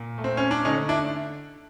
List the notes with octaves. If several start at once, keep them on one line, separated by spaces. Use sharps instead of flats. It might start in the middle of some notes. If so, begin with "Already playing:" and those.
Already playing: A#2
A3
C4
C#4
D4
D3 C#4 D#4
D4 E4